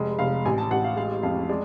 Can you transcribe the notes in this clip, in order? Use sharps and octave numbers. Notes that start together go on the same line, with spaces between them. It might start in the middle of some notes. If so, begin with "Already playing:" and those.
Already playing: F1 G#3
F1 F5
A1 G#5
A5
A1 F#5
F5
G#3 F5
F2 F5
G#3 D5